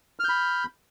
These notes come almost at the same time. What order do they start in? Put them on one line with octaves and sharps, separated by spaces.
F6 G6 B5